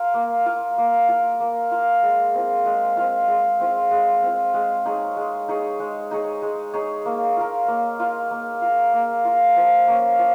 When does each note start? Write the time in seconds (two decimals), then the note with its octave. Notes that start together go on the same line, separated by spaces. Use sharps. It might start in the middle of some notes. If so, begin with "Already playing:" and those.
Already playing: F4 A#4
0.14 A#3
0.46 F4 A#4
0.78 A#3
1.08 F4 A#4
1.40 A#3
1.71 F4 A#4
2.03 G#3
2.34 C4 F4
2.66 G#3
2.97 C4 F4
3.28 G#3
3.60 C4 F4
3.91 G#3
4.23 C4 F4
4.54 G#3
4.85 D#4 G#4 C#5
5.17 G#3
5.48 D#4 G#4 C#5
5.80 G#3
6.11 D#4 G#4 C#5
6.42 G#3
6.73 D#4 G#4 C#5
7.05 A#3
7.37 F4 A#4
7.68 A#3
7.99 F4 A#4
8.31 A#3
8.62 F4 A#4
8.93 A#3
9.25 F4 A#4
9.56 F3
9.87 A#3 C#4
10.19 F3